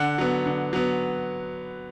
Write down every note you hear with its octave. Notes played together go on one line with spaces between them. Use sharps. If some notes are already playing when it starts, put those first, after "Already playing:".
Already playing: D3 F#5
F#3 B3
D3
F#3 B3